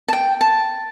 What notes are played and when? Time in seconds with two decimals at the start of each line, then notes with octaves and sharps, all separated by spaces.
0.08 A5
0.13 G5
0.41 A5